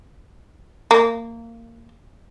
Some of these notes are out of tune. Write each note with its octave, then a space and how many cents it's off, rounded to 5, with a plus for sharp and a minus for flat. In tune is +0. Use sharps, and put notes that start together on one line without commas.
A#3 -20